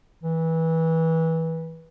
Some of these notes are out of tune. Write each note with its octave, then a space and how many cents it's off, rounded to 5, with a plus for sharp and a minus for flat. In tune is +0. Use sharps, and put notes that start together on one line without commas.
E3 -20